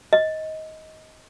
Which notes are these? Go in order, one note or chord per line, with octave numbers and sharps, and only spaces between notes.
D#5